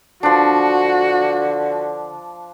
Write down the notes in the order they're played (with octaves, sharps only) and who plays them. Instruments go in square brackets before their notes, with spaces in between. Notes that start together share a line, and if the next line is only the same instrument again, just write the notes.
[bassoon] D3 [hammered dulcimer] F3 D4 [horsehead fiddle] F#4